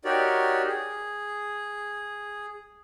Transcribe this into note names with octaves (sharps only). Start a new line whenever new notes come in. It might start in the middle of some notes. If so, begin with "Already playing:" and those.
D#4 F#4 G4 A#4 C#5 D5
G#4